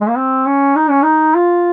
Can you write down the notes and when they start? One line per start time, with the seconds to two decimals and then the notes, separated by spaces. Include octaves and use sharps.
0.01 G#3
0.08 A#3
0.17 C4
0.46 C#4
0.76 D#4
0.89 C#4
1.02 D#4
1.35 F4